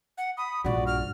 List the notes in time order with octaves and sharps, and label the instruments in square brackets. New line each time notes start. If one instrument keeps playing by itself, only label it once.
[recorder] F#5
[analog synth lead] B5 [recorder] D#6
[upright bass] A#1 G2 [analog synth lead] F#4 [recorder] D5
[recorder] F6